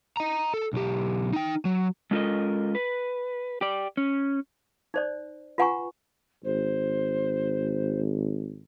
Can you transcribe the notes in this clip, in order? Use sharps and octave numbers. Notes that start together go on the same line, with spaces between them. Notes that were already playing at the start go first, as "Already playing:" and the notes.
D#5 A#5
A4
B1 G4
D#4 G5
F#3
G#3 C#4 F4 A4 A#4 D#5
B4
G4 D5
C#4
D#4 C5 D5
F4 B4 F#5 G#5 A#5 C#6
G#1 C5